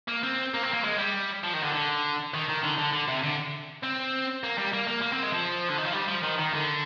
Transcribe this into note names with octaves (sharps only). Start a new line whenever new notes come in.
A#3
C4
A#3
C4
A#3
G#3
G3
F3
D#3
D3
D3
D#3
D#3
D3
D3
D3
C3
D3
C4
A#3
G3
A#3
A#3
A#3
C4
G#3
F3
D3
D#3
F3
G3
F3
D#3
D#3
D3